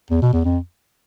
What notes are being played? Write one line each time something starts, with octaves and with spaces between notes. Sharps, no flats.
E2
B2
E2
F2